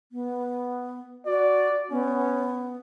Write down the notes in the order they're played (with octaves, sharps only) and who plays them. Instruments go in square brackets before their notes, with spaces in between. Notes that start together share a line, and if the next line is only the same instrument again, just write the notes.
[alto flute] B3
[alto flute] F#4 [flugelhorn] D5
[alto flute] B3 [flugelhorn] C#4